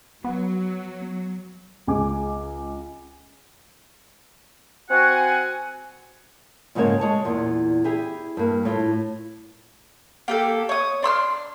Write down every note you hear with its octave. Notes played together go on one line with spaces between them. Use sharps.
F#3 B3
C#2 G#4 G#5 D6
C4 F#4 F#5 G#5
F2 G#2 C#3 A#3 C#5
G#3 C#5 A5
E2 A#2
E4 G4 G#4
G2 A#3
A2 F4
A#3 G4 A4
C#5 D#6
D4 C6 E6 F6